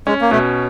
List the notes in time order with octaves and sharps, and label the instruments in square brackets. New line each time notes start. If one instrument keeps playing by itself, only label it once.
[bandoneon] G#3 [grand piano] C#4
[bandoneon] A#3
[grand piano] B2 [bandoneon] A3